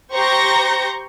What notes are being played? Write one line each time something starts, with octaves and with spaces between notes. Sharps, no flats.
G4 C5 A#5 C#6 G6 A#6